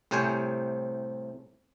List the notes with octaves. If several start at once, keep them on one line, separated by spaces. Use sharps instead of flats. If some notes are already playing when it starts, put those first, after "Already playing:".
C2 A2 C3 C5 C#5 G#5